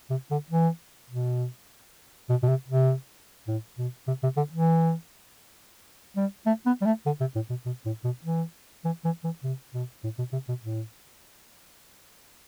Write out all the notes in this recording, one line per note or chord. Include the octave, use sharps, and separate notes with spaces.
C3
D3
E3
B2
B2
B2
C3
C3
A2
B2
C3
C3
D3
E3
G3
A3
B3
G3
A3
D3
C3
A2
B2
B2
A2
B2
E3
E3
E3
E3
C3
B2
A2
B2
C3
B2
A2